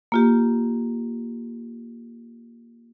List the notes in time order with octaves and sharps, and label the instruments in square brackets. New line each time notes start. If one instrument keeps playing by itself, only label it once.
[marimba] A#3 F4 G4